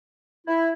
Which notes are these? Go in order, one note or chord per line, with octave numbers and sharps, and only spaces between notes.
E4